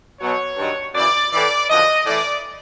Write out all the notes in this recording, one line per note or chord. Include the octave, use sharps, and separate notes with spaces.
B2 F#3 C#5
G2 D#3 F#3
F#2 C#3 E3 D5
A2 E3 D5
F#2 D3 F3 D#5
A2 E3 D5